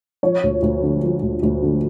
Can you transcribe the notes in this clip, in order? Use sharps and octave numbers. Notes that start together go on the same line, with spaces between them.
F3 C#5
D2
D2
D3
F3
D2
D2
D3